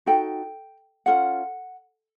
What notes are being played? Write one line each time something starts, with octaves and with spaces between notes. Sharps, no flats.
D#4 F#4 A4 G5
C#4 F4 A4 F#5